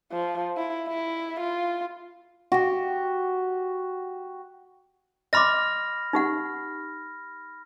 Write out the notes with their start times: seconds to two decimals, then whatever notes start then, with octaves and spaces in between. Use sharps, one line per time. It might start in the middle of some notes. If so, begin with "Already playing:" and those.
0.12 F3
0.57 E4
0.88 E4
1.41 F4
2.52 F#4 G4
5.33 D#5 B5 C6 D6 F6 A#6
6.13 D#4 G4 F#5